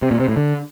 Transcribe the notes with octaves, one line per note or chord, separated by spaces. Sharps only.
C3
A#2
C3
A2
D3